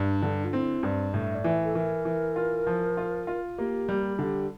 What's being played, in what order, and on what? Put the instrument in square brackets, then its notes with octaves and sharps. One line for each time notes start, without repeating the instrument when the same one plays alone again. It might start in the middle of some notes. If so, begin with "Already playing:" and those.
Already playing: [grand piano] G2 [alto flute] D4
[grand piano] D3
[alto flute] F4
[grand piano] C4 [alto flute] E4
[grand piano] G2 [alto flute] D5
[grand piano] A2 [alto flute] E5
[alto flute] D5
[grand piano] E3
[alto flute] A4
[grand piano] E3 [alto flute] A#4
[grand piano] E3
F4
F3
F4
F4
[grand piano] A#3 [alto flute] G4
[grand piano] G3
[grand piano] D3 [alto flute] G4